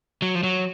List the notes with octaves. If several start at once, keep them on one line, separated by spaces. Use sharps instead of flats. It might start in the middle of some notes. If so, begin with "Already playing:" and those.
F#3
F3
F#3